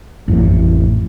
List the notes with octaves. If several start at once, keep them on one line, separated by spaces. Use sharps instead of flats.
A1 F2 A2